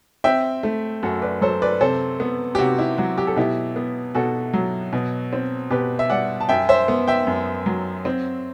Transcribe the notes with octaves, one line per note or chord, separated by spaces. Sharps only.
C4 E5 G5
A3
F#2 F#4 A4
B4 D5
F#3 A4 C5
B4 D5
C3 A4 C5
B3
G4
C3 F#4
E4
F#3 F#4
G4
A4
B2 E4 G4
B3
B2 F#4 A4
F#3
B2
C4
B2 G4 B4
E5
G3 D5 F#5
A5
F#2 E5 G5
C5 E5
B3
E5 G5
F#2
F#3
C4